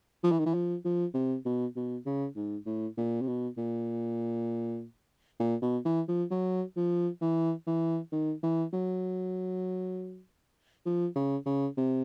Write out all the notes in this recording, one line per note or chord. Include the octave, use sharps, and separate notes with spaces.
F3
E3
D#3
E3
F3
F3
C3
B2
B2
C#3
G#2
A2
A#2
C3
B2
A#2
A#2
B2
E3
F3
F#3
F3
E3
E3
D#3
E3
F#3
F3
C#3
C#3
C3